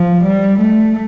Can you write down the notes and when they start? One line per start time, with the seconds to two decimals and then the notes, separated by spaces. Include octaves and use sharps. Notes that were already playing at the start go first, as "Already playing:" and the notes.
Already playing: F3
0.24 G3
0.59 A3